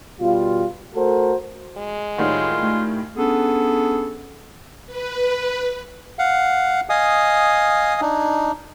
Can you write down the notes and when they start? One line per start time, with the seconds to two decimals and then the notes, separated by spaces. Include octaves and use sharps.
0.21 B2 G3 F4
0.95 A3 F#4 A4 A#4 C5
1.77 G#3
2.18 A2 D#3 G3 F4 C#5 F#5
2.62 A3 G#5
3.17 B3 C#4 D4 G#4 A4
4.86 B4
6.19 F5 F#5
6.89 D#5 F5 G#5 D#6
8.01 D4 D#4